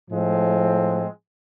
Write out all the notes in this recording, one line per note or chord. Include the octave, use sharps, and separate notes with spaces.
A2 F3 G#3 C4